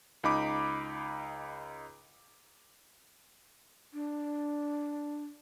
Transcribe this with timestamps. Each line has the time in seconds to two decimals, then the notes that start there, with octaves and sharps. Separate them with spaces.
0.24 C#2 D#4 B5 D6
3.93 D4